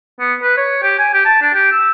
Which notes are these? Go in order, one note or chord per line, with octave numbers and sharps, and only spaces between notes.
B3
B4
C#5
G4
G#5
G4
A5
D4
G4
E6